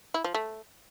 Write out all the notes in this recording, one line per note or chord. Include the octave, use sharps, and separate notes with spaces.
E4
F3
A3